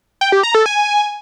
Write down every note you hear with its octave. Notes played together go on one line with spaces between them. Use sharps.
G5
G4
A#5
A4
G#5